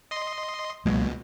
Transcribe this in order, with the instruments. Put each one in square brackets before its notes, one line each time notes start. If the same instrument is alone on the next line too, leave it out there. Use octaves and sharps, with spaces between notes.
[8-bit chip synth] D#5 C6
[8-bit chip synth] C#2 B2 [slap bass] F#3 G#3 A#3